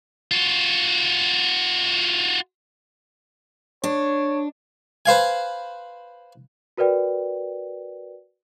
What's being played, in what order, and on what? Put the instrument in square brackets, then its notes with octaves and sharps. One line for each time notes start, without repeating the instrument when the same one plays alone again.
[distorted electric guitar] F4 F#4
[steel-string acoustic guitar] D4 [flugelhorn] C#5
[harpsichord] B4 C5 F5 G#5
[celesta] F#4 A#4 B4 D5 G5